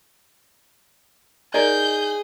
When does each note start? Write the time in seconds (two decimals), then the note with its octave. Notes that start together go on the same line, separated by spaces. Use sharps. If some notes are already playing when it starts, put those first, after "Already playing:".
1.54 D#4 G#4 A#4 D5 D#5 G6